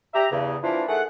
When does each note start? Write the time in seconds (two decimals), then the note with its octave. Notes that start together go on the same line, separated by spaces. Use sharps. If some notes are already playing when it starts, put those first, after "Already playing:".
0.14 G4 E5 A#5
0.31 E2 G2 C#3
0.63 E3 F3 A#3 D4 E4 F4
0.88 D#3 A3 G#4 F#5